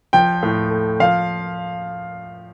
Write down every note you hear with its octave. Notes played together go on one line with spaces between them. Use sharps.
F3 G5
A2
A3
F3 F5